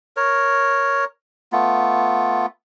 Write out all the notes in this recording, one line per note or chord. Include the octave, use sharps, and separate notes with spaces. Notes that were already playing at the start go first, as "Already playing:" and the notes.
A#4 C#5
A3 B3 F4